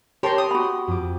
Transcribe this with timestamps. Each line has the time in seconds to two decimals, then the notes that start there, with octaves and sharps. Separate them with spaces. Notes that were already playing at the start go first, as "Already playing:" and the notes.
0.23 G4 A#4 C5 C#5 A5 C6
0.38 D#6
0.51 F#4 B5
0.88 F2 D6